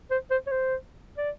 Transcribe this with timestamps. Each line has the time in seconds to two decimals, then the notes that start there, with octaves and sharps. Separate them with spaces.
0.11 C5
0.31 C5
0.47 C#5
0.51 C5
1.18 D5